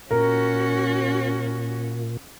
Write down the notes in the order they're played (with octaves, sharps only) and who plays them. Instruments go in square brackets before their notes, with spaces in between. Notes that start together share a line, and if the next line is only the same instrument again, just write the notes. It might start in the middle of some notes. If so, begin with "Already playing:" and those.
[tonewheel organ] A#2 [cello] C#4 F#4 [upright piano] A#4